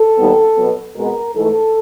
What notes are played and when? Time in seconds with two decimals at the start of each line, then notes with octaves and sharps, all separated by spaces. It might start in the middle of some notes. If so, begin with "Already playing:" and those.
Already playing: A4
0.17 D#2 D#3 G3 B3
0.57 B2 F#3 B3
0.96 B2 G#3 B3 A#4
1.35 G#2 E3 A3 A4